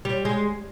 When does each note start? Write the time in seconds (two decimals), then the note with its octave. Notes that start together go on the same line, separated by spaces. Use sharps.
0.05 G3
0.25 G#3